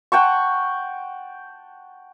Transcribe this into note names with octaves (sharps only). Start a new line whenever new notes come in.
F#5 G5 A5 C#6